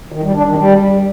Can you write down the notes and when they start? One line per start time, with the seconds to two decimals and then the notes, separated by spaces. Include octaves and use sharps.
0.12 D#3
0.24 G3
0.35 D4
0.46 D#3
0.58 G3